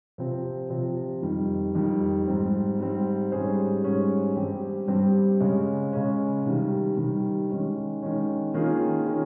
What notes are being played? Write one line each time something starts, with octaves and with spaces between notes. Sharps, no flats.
C3 F3 C4
C3 F3 C4
F2 D#3 G3
F2 D#3 G3
G#2 G3 C4
G#2 G3 C4
G#2 G3 C#4 G#4 C5
G#2 G3 C#4 G#4 C5
G2 G3 C4 G4
G2 G3 C4 G4
C#3 G#3 C#4
C#3 G#3 C#4
C3 D#3 G3
C3 D#3 G3
D#3 G#3 C#4
D#3 G#3 C#4
D#3 A#3 C#4 F4 G#4
D#3 A#3 C#4 F4 G#4